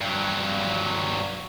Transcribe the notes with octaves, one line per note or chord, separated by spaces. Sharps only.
G2 F#3